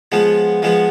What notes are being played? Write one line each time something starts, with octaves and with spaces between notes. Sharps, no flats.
F3 G#3 B3
F3 G#3 B3